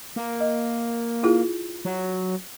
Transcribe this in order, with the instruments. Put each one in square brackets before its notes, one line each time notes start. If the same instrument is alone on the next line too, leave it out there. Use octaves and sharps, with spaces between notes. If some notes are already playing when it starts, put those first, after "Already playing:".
[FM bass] A#3
[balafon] D#5
E4 F4 G#4
[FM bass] F#3